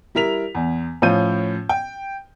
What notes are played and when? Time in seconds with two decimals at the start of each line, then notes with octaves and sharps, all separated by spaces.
0.15 G3 E4 A#4 B6 F7
0.55 E2
1.02 A2 F3 C#4 F4 G6 D#7
1.69 G5